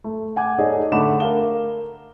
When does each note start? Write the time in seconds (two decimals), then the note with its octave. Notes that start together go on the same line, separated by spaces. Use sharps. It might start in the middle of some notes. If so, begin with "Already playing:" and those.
0.04 A3
0.36 F#5 G#5 D6 G#6
0.59 D#4 G#4 A4 C#5 D5
0.92 D3 A3 F#5 B5 D6 E7
1.20 A#4 F5 G7